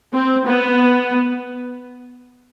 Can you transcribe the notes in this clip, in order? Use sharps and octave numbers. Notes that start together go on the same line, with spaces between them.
C4
B3